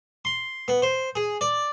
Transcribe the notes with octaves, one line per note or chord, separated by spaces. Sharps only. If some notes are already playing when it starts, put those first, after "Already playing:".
C6
B3
C5
G#4
D5